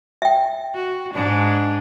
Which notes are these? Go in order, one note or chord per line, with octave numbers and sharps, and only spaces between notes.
E5 G5
F#4
G#2 G#3 D4